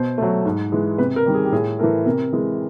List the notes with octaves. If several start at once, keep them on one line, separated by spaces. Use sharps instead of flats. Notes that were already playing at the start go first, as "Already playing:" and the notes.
Already playing: B2 C5
F#3 A3
G#2
E3 G#3
C3 B4
A#4
D#3 G3
G#4
G4
A2 G#4
E3 A3 A#4
C3 A#4
E3 G#3